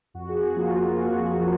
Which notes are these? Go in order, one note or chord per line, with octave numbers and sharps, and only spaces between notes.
F2 F#4
G#4
F#4
F3 A#3 F4
F2 F#4
F#4
F3 A#3